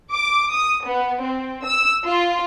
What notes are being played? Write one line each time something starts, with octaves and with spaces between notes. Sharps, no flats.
D6
D#6
B3
C4
E6
F4